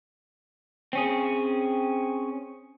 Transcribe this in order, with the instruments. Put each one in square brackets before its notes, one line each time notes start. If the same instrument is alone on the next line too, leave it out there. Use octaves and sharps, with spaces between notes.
[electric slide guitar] C4 C#4 G#4